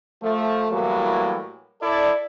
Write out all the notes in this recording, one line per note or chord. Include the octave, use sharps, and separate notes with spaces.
F3 A3
A2 E3 F#3 G3 A#3
E4 A4 D5